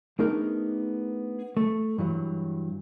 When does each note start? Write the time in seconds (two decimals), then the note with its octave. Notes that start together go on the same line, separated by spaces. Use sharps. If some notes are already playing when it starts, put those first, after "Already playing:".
0.19 A3 B3 D4 D#4 G#4 A#4
1.57 A3
1.98 G2 E3 F#3